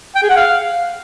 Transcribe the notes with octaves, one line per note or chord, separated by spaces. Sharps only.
G5
G#4
F#5
F5